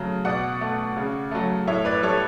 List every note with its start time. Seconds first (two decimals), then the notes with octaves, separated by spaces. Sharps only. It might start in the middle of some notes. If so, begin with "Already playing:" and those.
Already playing: C#3 F#3 A3
0.25 B2 D5 F#5
0.61 A3
0.97 C#3
1.31 F#3 A3
1.67 A2 C#5 E5
1.85 B4 D5
2.03 G3 A4 C#5